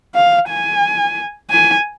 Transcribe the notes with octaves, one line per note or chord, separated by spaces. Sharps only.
F5
G#5
G#5